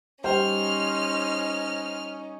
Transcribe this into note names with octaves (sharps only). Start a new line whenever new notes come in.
G3 C#4 D#4 G4 C5 G5 F6